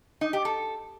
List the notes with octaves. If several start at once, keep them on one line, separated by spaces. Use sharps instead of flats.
D#4
G4
A4